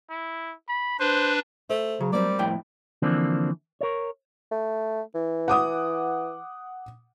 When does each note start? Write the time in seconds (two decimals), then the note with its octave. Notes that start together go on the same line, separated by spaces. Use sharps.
0.10 E4
0.68 B5
0.99 D4 B4 C5
1.70 A3 C5
2.01 C#3 F#3
2.13 G3 A#3 C4 G4 D5
2.39 F2 A2 G5
3.02 D3 E3 F3 A#3 C4 D4
3.81 A#4 C#5
4.52 A3
5.15 E3
5.48 F#5 D6 D#6